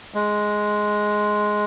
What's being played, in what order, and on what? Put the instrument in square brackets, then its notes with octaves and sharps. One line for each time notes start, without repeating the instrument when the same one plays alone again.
[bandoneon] G#3